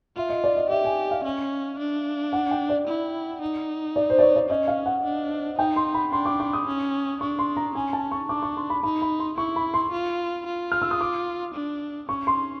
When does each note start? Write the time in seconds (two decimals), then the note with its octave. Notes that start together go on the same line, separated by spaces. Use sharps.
0.16 F4 E5
0.30 D#5
0.44 D5
0.57 D#5
0.70 G4 E5
0.84 G#5
1.11 F5
1.24 C#4
1.79 D4
2.33 F#5
2.51 G5
2.69 D5
2.87 E4
3.42 D#4
3.96 D5
4.10 C5
4.19 D5
4.23 C#5
4.36 D5
4.50 C#4 D#5
4.68 F5
4.86 F#5
5.04 D4
5.58 D#4 G5
5.76 C6
5.94 B5
6.12 D4 C6
6.26 D6
6.40 D6
6.53 D#6
6.67 C#4
7.21 D4 C#6
7.39 C6
7.57 A#5
7.75 C#4 G#5
7.93 A5
8.11 C#6
8.29 D4 D6
8.42 C#6
8.57 C6
8.70 B5
8.83 D#4 B5
9.02 B5
9.20 C6
9.37 E4 C#6
9.56 B5
9.74 C6
9.92 F4
10.46 F4
10.72 F6
10.82 E6
10.91 D#6
11.01 D6
11.54 D4
12.09 C#4 C#6
12.27 C6